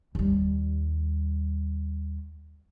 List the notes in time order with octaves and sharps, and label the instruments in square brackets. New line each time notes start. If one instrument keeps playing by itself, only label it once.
[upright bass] D#2 G3